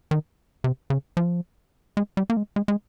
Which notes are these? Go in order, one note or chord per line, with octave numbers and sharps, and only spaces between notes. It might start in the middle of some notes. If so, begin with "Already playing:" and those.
D#3
C3
C#3
F3
G#3
G3
A#3
G#3
G#3
G#3